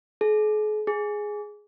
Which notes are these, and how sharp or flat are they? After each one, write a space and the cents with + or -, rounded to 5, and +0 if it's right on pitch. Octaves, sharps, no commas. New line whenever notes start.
G#4 +45
G#4 +5